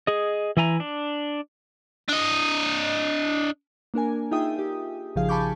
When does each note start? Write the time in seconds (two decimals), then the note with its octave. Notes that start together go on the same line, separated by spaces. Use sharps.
0.07 G#4 D#5
0.57 E3 E4 G#5 A#5
0.80 D4
2.08 D4 D#5
3.94 A#3 D4 A#4 G#5
4.31 D#4 F4 G#4 E5 G5 D#6
4.59 G4
5.16 A#1 C#3 F3 D#4 G#4 F5
5.29 G#5 A5 B5 C#6 D6 G6